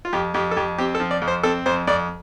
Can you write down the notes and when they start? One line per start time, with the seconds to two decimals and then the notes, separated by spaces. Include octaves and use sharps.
0.05 F4
0.13 F2 G4
0.34 F2 G4
0.51 A4
0.56 F2 G4
0.78 C4 G4
0.95 A4
1.00 F3
1.11 D5
1.22 F2
1.28 C5
1.43 C4 A4
1.66 F2 C5
1.87 F2 D5